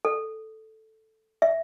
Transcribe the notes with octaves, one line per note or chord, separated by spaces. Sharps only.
A4
E5